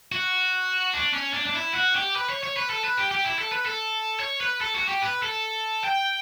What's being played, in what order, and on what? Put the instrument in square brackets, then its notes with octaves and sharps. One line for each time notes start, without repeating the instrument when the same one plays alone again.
[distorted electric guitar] F#4
D4
C#4
D4
D4
E4
F#4
G4
B4
C#5
C#5
B4
A4
B4
G4
G4
E4
A4
B4
A4
C#5
B4
A4
F#4
G4
B4
A4
G5